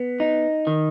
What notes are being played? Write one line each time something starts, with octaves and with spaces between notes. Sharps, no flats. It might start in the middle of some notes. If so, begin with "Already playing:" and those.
Already playing: B3
D#4
D#3